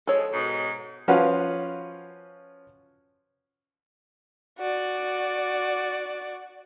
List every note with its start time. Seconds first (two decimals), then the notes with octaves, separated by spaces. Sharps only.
0.07 F3 G#3 A4 C#5
0.32 G#2 B2
1.08 F3 C#4 F#4 B4 F5
4.59 F#4 D5